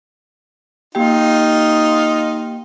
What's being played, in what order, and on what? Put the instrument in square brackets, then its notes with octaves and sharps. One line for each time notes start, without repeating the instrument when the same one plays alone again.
[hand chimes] A#3 G4 G5 [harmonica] D#4 F4